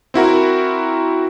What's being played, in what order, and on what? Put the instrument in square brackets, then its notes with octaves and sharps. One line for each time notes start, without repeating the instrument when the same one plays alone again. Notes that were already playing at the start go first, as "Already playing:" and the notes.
[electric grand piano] C4 E4 F#4 A#4